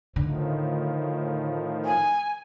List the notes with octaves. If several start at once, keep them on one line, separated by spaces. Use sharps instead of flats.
A2 D3 D#3 F3
G#5